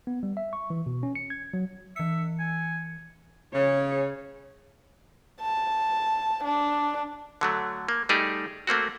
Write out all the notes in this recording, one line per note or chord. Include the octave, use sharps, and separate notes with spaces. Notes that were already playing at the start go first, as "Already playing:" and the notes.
B3
G3
E5
C#6
E3
B2
C#4
C#7
G#6
F#3
E3 E5 C#7
G#5
C#3 G#4 C#5
A5
D4
D3 F#3 A3
A#3
G3 A3 D#4 G4 G#4
A3 A#3 C4 F#4